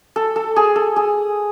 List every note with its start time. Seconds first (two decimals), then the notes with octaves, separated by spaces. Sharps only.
0.16 A4
0.36 A4
0.56 G#4
0.76 A4
0.96 G#4